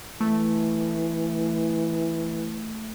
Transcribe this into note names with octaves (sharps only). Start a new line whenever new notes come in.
E3 A3